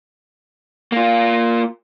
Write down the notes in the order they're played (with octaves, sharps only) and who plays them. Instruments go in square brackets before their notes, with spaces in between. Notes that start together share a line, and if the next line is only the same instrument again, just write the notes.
[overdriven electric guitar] A#3 F4